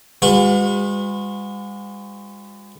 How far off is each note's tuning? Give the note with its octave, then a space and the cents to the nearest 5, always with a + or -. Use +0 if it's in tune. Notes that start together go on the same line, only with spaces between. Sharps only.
G#3 -45 F#4 -45 B4 +35